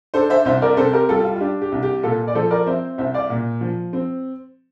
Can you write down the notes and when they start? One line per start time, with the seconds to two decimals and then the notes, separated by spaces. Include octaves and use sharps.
0.14 D4 A4 C5
0.30 C5 E5
0.45 C2 C5 E5
0.62 A#4 D5
0.77 C3 A4 C5
0.93 G4 A#4
1.09 G3 F4 A4
1.24 F4
1.36 F4
1.40 D4 G4
1.62 G4
1.72 C2
1.83 G4
2.03 A#2 F4 A4
2.28 D5
2.35 F3 A4 C5
2.50 A#4 D5
2.67 C4 C5 E5
2.98 C2 C5 E5
3.14 D5 F5
3.30 A#2
3.61 F3
3.93 C4